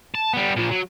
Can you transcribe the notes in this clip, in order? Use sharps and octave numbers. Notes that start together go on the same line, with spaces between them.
A5
G3 B3
A#2 F3
F#3